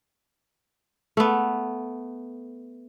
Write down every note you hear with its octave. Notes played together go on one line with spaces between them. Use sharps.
A3 B3